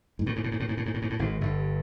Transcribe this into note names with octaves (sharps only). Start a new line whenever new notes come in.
G#2
A2
G#2
A2
G#2
A2
G#2
A2
G#2
A2
G#2
A2
G#1 G#2
G1 G2